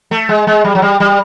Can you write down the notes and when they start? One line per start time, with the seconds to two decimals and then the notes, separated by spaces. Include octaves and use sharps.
0.11 A3
0.29 G#3
0.47 G#3
0.64 G3
0.75 F#3
0.82 G3
1.00 G3